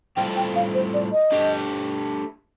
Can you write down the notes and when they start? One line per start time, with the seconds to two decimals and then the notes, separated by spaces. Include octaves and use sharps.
0.16 A2 G3 C4 F4 A4 G5
0.36 G5
0.56 F5
0.74 C5
0.94 D5
1.12 D#5
1.32 A3 D4 G4